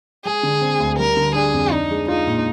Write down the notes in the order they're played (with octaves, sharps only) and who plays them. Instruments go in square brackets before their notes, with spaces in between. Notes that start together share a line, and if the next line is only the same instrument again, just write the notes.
[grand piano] G#3 [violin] G#4
[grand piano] D3
C4
D2
[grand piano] G3 [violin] A#4
[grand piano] D3
[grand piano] D4 [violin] G#4
[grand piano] F2
[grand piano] D4 [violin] D#4
[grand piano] G#3
[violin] D#4 [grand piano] F4
[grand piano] A#2